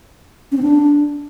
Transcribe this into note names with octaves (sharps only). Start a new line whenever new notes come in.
C#4
C4
D4